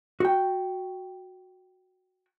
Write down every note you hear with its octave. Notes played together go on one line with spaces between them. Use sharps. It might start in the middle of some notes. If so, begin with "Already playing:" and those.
F#4 G5